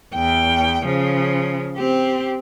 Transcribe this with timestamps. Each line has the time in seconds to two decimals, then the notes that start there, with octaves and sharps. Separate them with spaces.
0.14 E2 G5
0.85 C#3 F3
1.77 C4 G4